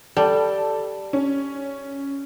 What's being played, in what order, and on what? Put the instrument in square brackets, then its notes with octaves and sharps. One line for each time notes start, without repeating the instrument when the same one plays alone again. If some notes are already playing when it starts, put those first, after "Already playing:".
[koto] G3 [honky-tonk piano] A4
[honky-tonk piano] C#4